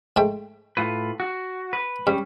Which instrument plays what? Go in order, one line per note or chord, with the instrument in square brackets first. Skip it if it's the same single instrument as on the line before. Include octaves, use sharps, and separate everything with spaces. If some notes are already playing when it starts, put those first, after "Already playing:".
[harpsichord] G#2 A3 G5
[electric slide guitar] A2 F4 B4
F#4
B4
[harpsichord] G2 [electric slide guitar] G3 C#4